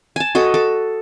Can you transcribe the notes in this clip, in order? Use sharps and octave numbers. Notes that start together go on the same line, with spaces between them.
G#5 A5
F#4 A4 D#5
A4